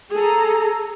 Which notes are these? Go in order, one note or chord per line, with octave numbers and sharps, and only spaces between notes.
G#4 A4 A#5